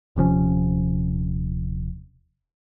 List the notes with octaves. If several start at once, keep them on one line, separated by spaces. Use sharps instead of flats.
D#1 C3 F3 C#4